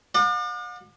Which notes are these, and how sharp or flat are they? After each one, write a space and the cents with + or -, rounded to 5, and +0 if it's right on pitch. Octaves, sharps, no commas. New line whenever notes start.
D5 +40 F#5 -45